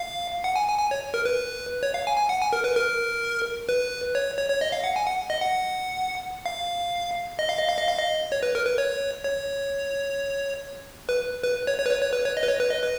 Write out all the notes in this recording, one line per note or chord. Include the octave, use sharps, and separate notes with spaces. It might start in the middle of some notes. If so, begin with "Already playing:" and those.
Already playing: F5
F#5
G#5
G#5
G#5
C#5
A#4
B4
C#5
F5
G#5
G#5
F#5
G#5
A#4
B4
A#4
B4
C#5
C#5
C#5
D#5
F5
F#5
G#5
F#5
D#5
F#5
F5
D#5
F5
D#5
F5
D#5
F5
D#5
C#5
B4
A#4
B4
C#5
C#5
B4
B4
C#5
C#5
B4
C#5
C#5
B4
C#5
D#5
B4
C#5
B4
D#5
B4